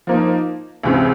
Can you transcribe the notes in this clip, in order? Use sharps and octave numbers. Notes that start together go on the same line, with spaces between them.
F3 A#3 D#4
C#2 C3 E3